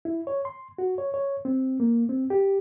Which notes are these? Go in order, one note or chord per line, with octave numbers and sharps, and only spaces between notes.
E4
C#5
C6
F#4
C#5
C#5
C4
A#3
C4
G4